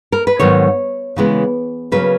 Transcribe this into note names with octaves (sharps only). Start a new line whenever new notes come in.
A#4
B4
G#2 D#3 F#3 B3 C#5
C#3 E3 G#3 B3
C#3 F#3 A#3 B4